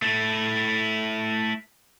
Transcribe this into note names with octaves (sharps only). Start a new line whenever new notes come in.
A3 E4